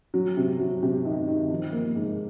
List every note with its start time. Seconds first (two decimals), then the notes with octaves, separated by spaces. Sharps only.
0.14 F#3
0.37 C3
0.59 F#3
0.83 C3
1.05 D#3
1.28 D#3
1.50 F3
1.72 A#3
1.96 G#2